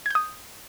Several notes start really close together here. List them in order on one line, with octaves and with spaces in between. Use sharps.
G#6 G6 D#6